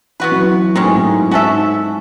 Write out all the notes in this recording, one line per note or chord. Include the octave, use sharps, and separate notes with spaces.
E3 B3 F#4 B4
F#3
E3
A2 D#3 G#3 C#4
G#2
A2
G#2 C#4 F#4 A4 E5